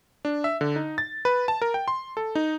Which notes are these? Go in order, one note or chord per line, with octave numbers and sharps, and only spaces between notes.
D4
E5
D3
D#4
A6
B4
A5
A#4
G5
C6
A4
D#4